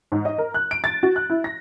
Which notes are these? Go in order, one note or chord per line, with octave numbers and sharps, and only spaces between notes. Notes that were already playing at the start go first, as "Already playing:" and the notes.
G#2
D#5
A#4
F#6
D7
A6
F#4
F#6
E4
A#6